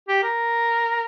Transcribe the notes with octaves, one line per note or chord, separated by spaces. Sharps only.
G4
A#4